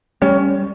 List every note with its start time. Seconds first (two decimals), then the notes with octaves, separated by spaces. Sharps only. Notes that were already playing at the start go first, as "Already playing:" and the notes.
0.22 G3 C#4